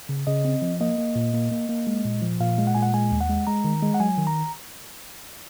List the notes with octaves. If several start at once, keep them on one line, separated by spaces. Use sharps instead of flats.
C#3
C#3 D#5
C4
F3
A#3 D#5
A#3
A#2
A#3
A#3
A#3
G#3
A#2
F3
A#2 F5
G#3
F#5
A#2 G#5
F#5
G#3 G#5
D#2
F#5
G#3
G#3 A#5
D#3
G#3
F#5
F#3 G#5
D#3
A#5